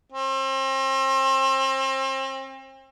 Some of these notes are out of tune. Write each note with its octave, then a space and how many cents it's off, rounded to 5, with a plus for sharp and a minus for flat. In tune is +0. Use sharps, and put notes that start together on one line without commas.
C4 +35